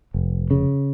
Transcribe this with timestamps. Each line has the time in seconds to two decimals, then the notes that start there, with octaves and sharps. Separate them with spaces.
0.14 F1
0.51 C#3